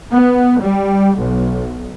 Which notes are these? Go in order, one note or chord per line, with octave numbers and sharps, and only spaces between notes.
B3
G3
B1